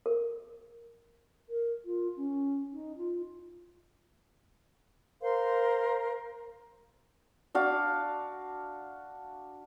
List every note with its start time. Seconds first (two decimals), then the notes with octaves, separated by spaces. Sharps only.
0.06 A#4
1.49 A#4
1.85 F4
2.17 C#4
2.72 D#4
2.97 F4
5.21 A#4 C5 F5 C6
7.54 D4 F#4 F5 D6